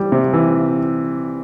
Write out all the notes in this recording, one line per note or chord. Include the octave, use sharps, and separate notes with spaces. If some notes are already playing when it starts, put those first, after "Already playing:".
Already playing: E3 G3
C3
E3